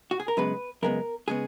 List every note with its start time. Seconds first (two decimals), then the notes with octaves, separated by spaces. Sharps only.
0.11 F#4
0.20 G#4
0.28 A#4
0.37 F#2 C#3 G#3 B3 B4
0.82 F#2 C#3 G#3 B3 A#4
1.28 C#3 G#3 B3 G#4